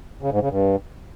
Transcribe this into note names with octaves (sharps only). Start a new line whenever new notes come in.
C#3
G#2
C#3
G2